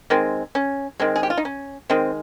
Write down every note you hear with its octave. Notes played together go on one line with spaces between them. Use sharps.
D#3 G#3 C4
C#4
D#3 G#3 C4
G#4
G4
F4
D#4
C#4
D#3 G#3 C4